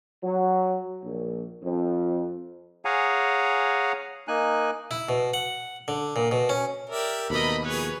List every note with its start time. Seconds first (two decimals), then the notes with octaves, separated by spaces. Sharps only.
0.23 F#3
1.02 A#1
1.63 F2
2.85 G#4 C#5 F5 F#5 G#5 A#5
4.28 A#3 D#4 G#5 F#6
4.91 E4
5.09 B2
5.34 F#5
5.88 D3
6.16 A#2
6.31 B2
6.49 C#4
6.90 G4 A#4 D5 E5
7.30 D#2 B2 A3 A#4 D#5 B5
7.65 F3 G#4 B4 C#5